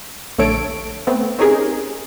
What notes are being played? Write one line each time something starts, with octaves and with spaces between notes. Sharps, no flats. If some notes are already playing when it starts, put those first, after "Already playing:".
A#1 D3 A3 A4 C#5 D7
A3 B3 C4
C4 C#4 D#4 G4 G#4 A#4